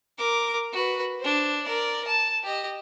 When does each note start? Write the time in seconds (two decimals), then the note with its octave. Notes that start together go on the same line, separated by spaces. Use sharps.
0.18 A#4 D6
0.73 F#4 B4
1.20 D4 C5
1.64 A#4 D5
2.07 A5
2.43 G4 D#5